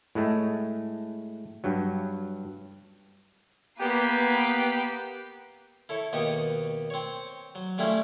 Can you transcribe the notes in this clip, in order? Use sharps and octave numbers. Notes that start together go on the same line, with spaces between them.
A2 G#3 A3
G2 F#3
A#3 B3 G4 B4
E4 A4 C#5
D#2 B2 G4 D#5 C#6
C4 C#5
F#3
G3 A3 C#4 E4 F4